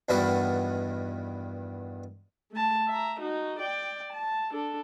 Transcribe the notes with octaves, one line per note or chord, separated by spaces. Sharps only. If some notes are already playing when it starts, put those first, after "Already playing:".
E2 G2 D#3 B3 F#4 D5
A3 A5
E5 A#5
D#4 F#4
D5 G5
A5
D4 A4